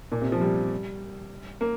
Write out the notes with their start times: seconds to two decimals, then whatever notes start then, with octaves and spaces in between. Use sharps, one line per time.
0.12 A#2
0.22 C3
0.32 F3
0.41 G3
1.61 A#3